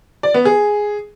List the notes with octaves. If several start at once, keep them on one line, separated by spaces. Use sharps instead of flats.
D5
B3
G#4